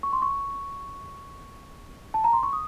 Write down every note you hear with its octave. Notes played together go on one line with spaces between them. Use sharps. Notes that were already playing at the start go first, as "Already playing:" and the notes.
C#6
C6
C#6
A5
A#5
C6
C#6
D#6